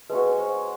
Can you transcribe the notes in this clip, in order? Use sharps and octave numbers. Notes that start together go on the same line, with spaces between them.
G#3 C#4 F#4 B4
C5